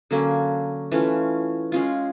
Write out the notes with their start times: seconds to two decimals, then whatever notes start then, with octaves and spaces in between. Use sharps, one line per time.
0.11 D3 F#3 A#3 C#4
0.92 E3 A3 C#4 F4
1.72 G#3 C#4 F4